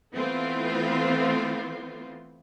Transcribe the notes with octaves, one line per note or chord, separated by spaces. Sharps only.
E3 A3 B3 C4 F4